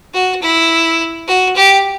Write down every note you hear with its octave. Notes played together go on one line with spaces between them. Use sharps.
F#4
E4
F#4
G4